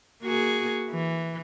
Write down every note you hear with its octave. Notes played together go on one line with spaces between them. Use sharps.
A#3 F#4 G#4
E3